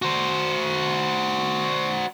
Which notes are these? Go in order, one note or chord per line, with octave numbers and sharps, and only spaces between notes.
F#4 C5